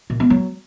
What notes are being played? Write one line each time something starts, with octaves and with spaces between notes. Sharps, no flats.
A#2
B3
F#3